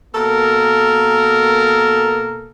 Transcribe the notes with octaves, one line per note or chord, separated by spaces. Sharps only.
B2 A#3 A4 A#4